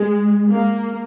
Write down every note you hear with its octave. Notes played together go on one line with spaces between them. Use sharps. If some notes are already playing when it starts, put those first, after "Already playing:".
Already playing: G#3
A#3